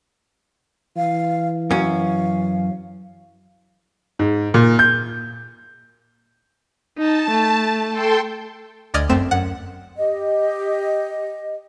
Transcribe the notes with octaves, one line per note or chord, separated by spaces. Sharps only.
E3 F5
F#2 C#4 F5
G#2
A#2
G6
D#4 A5
A3
A4 G5 C6
D2 D5 D#5 F6 G#6
G1 F#2 A3 C4 E7
F#2 F#5
G4 D#5